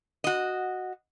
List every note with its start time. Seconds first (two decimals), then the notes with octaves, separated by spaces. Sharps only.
0.24 F#4 D#5